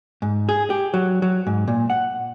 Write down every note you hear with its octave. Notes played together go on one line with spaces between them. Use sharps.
G#2
G#4
G4
F#3
F#3
G#2
A#2
F#5